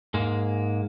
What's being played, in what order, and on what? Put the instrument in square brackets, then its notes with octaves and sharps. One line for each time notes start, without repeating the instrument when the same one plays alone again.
[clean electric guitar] G#2 G#3 A#3